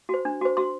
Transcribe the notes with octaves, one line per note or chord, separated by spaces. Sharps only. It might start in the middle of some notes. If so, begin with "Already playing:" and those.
F#4 C5
D4
F#4 C5
F#4 C6